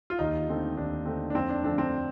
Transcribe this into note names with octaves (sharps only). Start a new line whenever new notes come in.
F4
D#2 D#4
D3 A3 C4
D#2 D4
D3 A3 C4
D4
F2 C4
D4
D3 F3 A3 C4 D4
C4